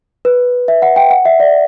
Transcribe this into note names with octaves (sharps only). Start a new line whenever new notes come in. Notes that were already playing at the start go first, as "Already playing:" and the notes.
B4
E5
F#5
G5
F#5
E5
D5